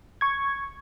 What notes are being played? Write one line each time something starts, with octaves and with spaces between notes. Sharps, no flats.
C#6 G#6